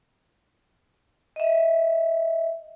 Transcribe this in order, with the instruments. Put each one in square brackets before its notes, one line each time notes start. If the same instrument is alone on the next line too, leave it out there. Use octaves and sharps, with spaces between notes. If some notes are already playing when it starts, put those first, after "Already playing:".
[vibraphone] D#5 E5